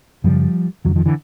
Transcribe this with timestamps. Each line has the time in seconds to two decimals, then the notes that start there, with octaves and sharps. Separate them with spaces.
0.24 F#2 C#3 F3 G3
0.85 F2 E3 F#3
0.88 D3
0.96 D#3 F3
1.06 D3 E3